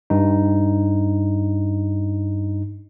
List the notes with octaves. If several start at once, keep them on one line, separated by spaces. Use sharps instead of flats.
G2 D#4